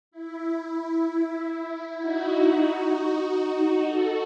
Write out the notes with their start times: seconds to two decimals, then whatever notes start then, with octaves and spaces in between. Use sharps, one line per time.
0.11 E4
0.74 E4
1.99 D#4 F#4
3.87 F#4 A4